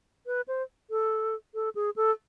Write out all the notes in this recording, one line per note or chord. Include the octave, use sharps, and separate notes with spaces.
B4
C5
A4
A4
G#4
A4